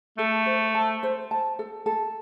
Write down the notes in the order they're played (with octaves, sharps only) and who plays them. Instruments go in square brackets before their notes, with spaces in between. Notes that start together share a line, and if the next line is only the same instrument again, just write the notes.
[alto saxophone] A3 [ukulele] A4
[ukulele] C5
A5
C5
A5
A4
A4